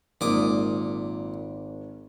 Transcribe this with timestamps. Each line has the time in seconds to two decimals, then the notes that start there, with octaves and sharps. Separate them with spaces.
0.21 G#1 A#2 D6 D#6